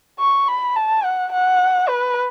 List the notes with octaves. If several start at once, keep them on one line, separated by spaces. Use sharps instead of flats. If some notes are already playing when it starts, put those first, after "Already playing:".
C#6
B5
A5
F#5
F#5
B4